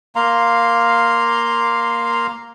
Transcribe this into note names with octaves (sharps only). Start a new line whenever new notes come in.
A#3 F5 A#5 C6